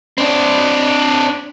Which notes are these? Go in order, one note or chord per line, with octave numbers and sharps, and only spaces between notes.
C4 D4